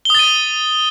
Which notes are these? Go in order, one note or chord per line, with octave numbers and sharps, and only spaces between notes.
D#6 A6 D#7 G7